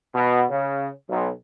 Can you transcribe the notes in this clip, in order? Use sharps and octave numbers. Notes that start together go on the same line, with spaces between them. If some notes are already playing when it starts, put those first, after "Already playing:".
B2
C#3
B1